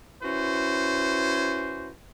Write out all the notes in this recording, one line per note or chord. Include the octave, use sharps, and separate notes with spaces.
C#4 E4 F#4 B4 C5